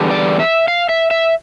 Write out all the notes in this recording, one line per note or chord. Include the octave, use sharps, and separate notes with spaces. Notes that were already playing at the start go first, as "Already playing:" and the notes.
Already playing: E2 D3 G3
D5
E5
F5
E5
E5